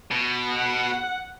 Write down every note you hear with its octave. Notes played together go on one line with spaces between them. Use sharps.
B2
F#5